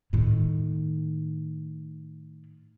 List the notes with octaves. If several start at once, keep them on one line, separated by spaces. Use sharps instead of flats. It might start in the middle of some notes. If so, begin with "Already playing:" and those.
A2 D#3